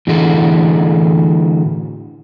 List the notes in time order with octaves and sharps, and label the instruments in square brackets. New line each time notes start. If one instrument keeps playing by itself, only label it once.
[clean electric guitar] A2 D3 E3 F#4 G#4 A4